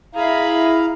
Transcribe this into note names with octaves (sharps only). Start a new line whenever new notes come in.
E4 G#4 F5 A#5 B5